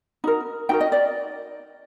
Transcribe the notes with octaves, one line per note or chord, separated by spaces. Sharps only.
D#4 F#4 A#4
D#4 F#4 A#4 G5
D#5
D5